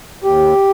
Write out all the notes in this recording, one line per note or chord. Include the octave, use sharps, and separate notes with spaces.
D#2 G4